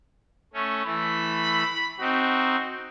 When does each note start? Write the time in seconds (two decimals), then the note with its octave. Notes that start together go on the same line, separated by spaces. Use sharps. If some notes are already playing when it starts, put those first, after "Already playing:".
0.53 A3 C#4
0.86 E3 A3 B5
2.00 C4 D#4 F#4